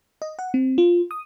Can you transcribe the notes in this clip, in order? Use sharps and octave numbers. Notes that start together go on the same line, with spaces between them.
D#5
F#5
C4
F4
D#6